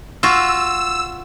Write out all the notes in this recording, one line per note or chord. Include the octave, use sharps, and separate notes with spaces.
F4 F#4 E6